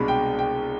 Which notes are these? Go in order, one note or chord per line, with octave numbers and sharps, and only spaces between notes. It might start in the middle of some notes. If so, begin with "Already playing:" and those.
Already playing: C2 B2 G#3 D4 B5
G5
G5